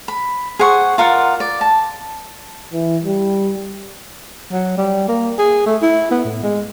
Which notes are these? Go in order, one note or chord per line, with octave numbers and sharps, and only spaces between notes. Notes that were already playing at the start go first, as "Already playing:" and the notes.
B5
G#4 C5 F#5 C#6
F4 A#4 D5 F#5
D5
A5
E3
G3
F#3
G3
A#3
G#4
A3
E4
B3
A2
G#3